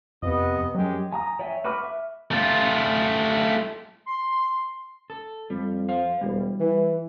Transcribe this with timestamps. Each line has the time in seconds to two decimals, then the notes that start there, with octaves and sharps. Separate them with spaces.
0.23 F2 C3 B3 D#5
0.75 F#2 F#3 G#3 G4
1.12 G#5 A#5 D#6
1.39 C#5 D5 E5 G5 G#5
1.64 F#4 B4 B5 D6 F6
1.83 E5
2.31 A3 F4
4.07 C6
5.10 A4
5.50 F2 G3
5.89 C5 F5
6.21 E1 G3
6.60 E3